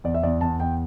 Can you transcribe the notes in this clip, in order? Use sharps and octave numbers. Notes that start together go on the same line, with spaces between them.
E2 D5
E5
E2 D5
E2 A5
E2 G5